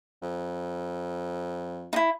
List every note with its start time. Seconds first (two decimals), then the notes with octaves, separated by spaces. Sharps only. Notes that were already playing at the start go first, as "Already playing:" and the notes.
0.22 F2
1.93 D#4 E4